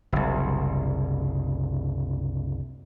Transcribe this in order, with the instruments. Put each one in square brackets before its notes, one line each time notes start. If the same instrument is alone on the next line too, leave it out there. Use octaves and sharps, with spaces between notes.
[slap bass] F#1 C2